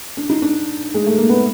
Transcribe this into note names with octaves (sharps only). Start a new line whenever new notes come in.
D4
D#4
D4
G#3
A3
A#3
B3